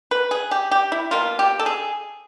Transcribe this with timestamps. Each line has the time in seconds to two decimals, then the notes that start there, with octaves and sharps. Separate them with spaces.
0.11 B4
0.31 G#4
0.51 G4
0.71 G4
0.92 E4
1.11 B2 G3 A#3 F4
1.39 G4
1.59 A4
1.66 G#4